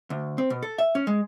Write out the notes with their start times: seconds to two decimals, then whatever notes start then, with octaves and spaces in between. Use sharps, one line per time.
0.10 D2
0.38 C4
0.50 B2
0.63 A4
0.78 E5
0.95 C#4
1.07 G#3